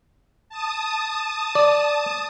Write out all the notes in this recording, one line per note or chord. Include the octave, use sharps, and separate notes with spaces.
A5 D#6
D5